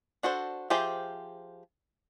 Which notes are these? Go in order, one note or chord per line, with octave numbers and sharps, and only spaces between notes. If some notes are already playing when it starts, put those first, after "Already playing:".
D4 F#4 A4 C5
F3 G4 G#4 C5 E5